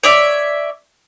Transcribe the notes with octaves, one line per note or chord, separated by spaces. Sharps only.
C#5 D5 E5